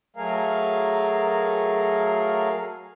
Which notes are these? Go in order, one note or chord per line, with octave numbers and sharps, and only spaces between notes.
F#3 A3 G#4 A#4 F5